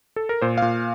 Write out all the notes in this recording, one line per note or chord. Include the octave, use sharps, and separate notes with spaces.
A4
A#4
A#2 C5
F5
A#2